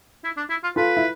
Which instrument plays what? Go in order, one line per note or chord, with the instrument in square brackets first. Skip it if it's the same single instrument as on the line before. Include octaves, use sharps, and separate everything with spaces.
[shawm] E4
D4
E4
F4
[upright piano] F4 A4 [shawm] B4
[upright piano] E4